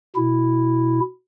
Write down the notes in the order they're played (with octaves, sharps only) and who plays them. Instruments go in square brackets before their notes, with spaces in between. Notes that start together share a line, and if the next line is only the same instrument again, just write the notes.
[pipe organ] B2 E4